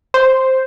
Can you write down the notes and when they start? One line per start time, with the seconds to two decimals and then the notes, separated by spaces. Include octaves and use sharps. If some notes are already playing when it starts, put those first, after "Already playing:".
0.14 C5